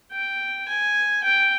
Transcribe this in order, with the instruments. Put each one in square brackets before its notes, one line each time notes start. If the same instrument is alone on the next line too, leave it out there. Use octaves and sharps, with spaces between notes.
[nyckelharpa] G5
G#5
G5